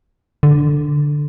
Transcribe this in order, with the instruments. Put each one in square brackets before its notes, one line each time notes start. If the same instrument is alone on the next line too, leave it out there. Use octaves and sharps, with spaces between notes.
[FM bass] D3